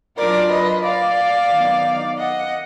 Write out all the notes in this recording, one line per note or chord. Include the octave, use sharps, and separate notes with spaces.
F#3 D4 F4 A#4 D5
B4 D#5
D5 F5
D#3 F#3 B3 D#4
D#5 F#5